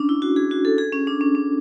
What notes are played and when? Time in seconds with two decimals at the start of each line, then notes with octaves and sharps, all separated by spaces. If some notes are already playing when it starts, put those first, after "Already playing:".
Already playing: C#4 D4
0.09 E4
0.22 F#4
0.36 G#4
0.51 F#4
0.65 A4
0.78 G#4
0.93 C#4
1.07 D4
1.21 C#4
1.35 C#4